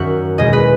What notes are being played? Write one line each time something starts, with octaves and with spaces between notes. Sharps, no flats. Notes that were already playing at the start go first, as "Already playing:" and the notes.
Already playing: F#2 D#3 F#3 E5 F#5
E2 B2 G#3 D#5
B4